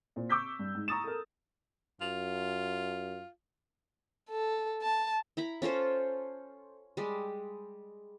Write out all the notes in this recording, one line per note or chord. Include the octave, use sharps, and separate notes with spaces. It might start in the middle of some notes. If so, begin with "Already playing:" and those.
A#2 C5
C#6 D6 E6 G6 B6
G2
G#2
A#5 C#6 D#6 A6 E7
A4 A#4
F#2 F4
A4
A5
E4 A#5 B5
C#4 F4 A4 C5
G3 G#3